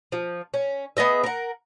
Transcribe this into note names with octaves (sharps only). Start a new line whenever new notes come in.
F3
C#4
B3 G#4 D#5 E5
A#4 F#5